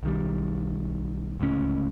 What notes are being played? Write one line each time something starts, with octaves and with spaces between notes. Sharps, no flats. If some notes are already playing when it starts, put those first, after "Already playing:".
B1 D#3 G3
D1 C#2 A2 C#4